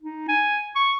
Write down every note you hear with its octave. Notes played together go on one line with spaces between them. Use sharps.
D#4
G#5
C#6